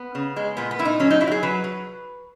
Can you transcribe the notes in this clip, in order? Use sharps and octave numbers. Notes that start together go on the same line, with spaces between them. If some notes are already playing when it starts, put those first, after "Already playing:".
Already playing: B3
C#3
G#3
A#2 B3
B3
A#2 E4
D#4
F#3 C#4
D#4
F#3 E4
F#4
G#4
F#3 B4
F#3